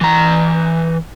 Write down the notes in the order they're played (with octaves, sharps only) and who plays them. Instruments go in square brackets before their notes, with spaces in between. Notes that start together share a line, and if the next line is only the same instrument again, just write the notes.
[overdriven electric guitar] E3 A#5